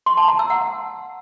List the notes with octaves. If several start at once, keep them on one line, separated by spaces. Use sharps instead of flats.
C6
A5
A#5
E6
F#5